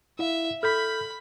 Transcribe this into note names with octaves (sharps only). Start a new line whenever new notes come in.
E4 E5 F5
A4 B5 F6 G6 B6